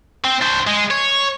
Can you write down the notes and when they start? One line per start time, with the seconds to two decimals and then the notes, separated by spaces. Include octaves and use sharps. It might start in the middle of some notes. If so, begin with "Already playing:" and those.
0.25 C4
0.42 D4 C5
0.67 G#3
0.91 C#5